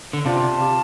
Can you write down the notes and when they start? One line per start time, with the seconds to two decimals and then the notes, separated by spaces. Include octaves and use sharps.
0.13 D3
0.25 C3 C4 F4 D5 F5 A5
0.58 G4 F5 A5